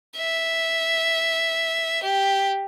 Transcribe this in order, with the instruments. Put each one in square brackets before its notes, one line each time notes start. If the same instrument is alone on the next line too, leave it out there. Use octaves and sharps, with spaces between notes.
[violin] E5
G4